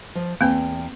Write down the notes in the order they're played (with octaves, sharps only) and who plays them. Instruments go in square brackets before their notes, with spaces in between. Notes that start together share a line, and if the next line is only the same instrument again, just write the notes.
[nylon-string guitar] F3
[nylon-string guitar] E2 G5 [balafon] A#3 C4